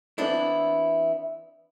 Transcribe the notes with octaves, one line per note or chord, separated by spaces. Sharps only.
E3 B3 C4 D4 E4